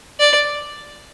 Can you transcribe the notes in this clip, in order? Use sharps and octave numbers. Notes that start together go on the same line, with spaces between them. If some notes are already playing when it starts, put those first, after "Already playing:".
D5